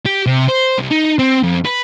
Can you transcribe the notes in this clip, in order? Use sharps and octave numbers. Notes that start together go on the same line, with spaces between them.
G4
C3
C5
C2
D#4
C4
F2
B4